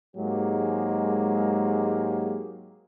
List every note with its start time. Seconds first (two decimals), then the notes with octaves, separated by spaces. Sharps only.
0.16 G#2 F#3 G#3 A#3 G4 G#4